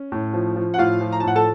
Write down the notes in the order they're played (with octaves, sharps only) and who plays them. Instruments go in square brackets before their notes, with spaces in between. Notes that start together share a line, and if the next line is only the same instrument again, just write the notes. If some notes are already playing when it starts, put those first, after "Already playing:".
Already playing: [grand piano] C#4
A2
F3
F3
F#5
A2 F4 F5
F3
A#5
A5
A2 F#5
A4 A5